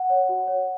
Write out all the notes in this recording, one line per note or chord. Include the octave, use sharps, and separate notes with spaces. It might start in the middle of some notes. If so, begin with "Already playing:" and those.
Already playing: F#5
C#5
F#4
C#5